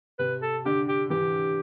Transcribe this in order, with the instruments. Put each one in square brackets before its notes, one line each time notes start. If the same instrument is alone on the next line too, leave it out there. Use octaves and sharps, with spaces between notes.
[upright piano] C3 [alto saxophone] B4
[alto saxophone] A4
[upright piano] D3 [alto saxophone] G4
[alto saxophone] G4
[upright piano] E3 [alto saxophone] G4